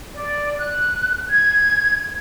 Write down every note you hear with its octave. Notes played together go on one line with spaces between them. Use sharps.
D5
F#6
G#6